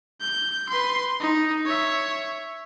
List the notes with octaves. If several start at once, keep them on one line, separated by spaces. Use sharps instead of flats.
G6
B4 C6
D#4
C#5 E5